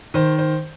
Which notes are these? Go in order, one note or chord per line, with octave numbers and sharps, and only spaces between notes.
D#3 C5
C5